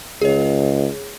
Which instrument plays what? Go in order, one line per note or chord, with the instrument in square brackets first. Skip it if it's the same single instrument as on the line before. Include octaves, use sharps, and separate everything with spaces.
[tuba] C#2 [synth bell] G#4 C#5